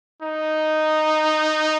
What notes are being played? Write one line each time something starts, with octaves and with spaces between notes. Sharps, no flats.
D#4